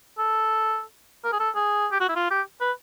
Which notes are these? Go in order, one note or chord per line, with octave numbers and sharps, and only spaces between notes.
A4
A#4
G#4
A4
G#4
G4
F#4
E4
F4
G4
B4